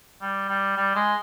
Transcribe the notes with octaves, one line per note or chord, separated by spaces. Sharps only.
G3
G3
G3
G#3